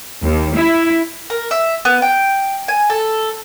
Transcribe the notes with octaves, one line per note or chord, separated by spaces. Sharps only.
D#2
E4
A#4
E5
B3
G5
G#5
A4